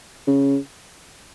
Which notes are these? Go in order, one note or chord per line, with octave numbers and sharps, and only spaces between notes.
C#3